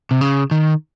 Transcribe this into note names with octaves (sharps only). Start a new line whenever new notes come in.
C3
C#3
D#3